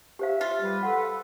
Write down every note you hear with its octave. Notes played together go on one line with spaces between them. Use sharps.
G4 C5 E5 F5
F4
G3 B4
A4 F#5 C6